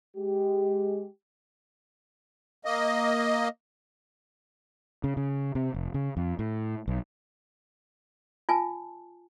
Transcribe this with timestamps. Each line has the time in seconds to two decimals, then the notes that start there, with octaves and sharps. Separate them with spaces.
0.16 G#3 G4
2.65 A#3 D#5
5.04 C#3
5.17 C#3
5.55 C3
5.74 F1
5.94 C#3
6.17 F2
6.39 A2
6.88 B1
8.49 F4 G#5 A5